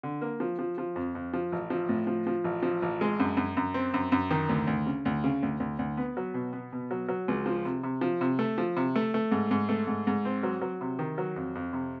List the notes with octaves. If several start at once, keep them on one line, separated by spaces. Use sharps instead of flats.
D3
A#3
F3
F3
F3
F2
F2
F3
A1
F3
A2
F3
F3
A1
F3
A1
G#3
F#2
F#2
F#2
C4
F#2
F#2
D#3
D2
D2
C#3
D2
C#3
D2
D2
D2
B3
F#3
B2
B3
B2
F#3
F#3
C#2
F3
C3
C3
F3
C3
A3
F3
C3
A3
A3
G#2
G#2
A3
G#2
G#2
C4
F#3
F#3
C3
D#3
F#3
F2
F2
C3